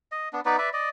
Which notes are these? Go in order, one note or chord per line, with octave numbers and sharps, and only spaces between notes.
D#5
B3 D4
B3 D#4 B4 D5
B4 D5 E5
D5 D#5